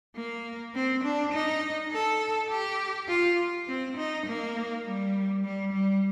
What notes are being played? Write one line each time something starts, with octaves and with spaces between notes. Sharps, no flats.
A#3
C4
D4
D#4
A4
G4
F4
C4
D#4
A#3
G3
G3
G3